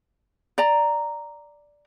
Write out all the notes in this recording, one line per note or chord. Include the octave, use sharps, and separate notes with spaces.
D5 A#5